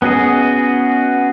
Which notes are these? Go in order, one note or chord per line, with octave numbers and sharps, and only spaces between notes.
B3 C#4 F#4 G#4 D#5